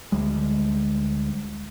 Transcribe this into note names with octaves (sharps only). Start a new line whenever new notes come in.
D2 G3 G#3